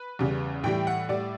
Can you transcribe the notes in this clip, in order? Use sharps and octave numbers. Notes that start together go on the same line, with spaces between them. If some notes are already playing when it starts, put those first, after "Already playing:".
Already playing: B4
E2 C#3 G3
A2 E3 G3 G5
F#5
A2 G3 D5